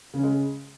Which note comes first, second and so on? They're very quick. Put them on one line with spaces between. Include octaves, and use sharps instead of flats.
C#3 C#4 G#3